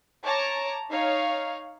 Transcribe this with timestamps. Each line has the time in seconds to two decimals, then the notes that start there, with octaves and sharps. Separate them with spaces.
0.25 C#5 A5 A#5 D6
0.91 D#4 C#5 F5